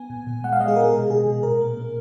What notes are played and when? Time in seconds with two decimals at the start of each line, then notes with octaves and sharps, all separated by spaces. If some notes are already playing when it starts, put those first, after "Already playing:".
Already playing: B3 G#5
0.10 A#2
0.27 A#2
0.44 G#3 F#5
0.53 F5
0.60 G#3 D#5
0.68 G#4
0.76 B3 A#4
0.84 G#4
0.94 B2
1.10 B2 G#4
1.26 B2
1.43 A#2 A#4
1.61 A#3
1.77 A#3